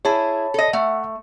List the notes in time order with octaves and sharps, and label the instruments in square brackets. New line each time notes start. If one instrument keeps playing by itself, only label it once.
[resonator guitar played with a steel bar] E4 G#4 [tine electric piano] C#5 A5 B5
[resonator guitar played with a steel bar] A4 D#5
[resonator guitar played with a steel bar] A3 [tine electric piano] E5 F#5